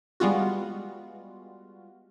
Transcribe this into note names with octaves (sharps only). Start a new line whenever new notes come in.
G3 G#3 B3 F4 F#4